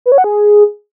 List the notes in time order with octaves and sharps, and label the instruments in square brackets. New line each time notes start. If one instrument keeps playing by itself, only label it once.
[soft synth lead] B4
C#5
F#5
G#4